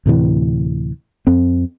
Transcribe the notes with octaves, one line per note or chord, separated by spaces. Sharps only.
D2 A2 C3 E3
F2 C4